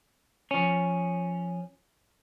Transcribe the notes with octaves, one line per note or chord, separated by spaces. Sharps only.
F3 C#4